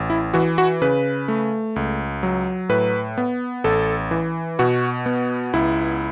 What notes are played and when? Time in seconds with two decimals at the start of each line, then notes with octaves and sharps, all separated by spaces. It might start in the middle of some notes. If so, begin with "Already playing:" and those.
Already playing: A1
0.10 E4
0.34 E3 F#4
0.58 F#4
0.82 C#3 B4
1.28 A3
1.76 C#2
2.23 F#3
2.69 A2 B4
3.18 B3
3.64 A1 A4
4.11 E3
4.59 B2 F#4
5.06 B3
5.53 C#2 E4